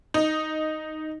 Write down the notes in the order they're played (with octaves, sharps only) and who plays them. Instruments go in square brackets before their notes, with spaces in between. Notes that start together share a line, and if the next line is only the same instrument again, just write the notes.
[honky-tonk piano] D#4